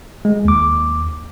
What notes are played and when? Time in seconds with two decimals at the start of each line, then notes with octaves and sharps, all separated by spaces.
0.25 G#3
0.45 D#2 D6